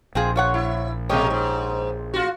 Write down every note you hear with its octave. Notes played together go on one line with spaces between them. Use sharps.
A#1 C4 F4 G#4
F4 C#5 F#5
E4
B2 G#3 A#3 G4 C#5 D#5
G#2
F4 F#4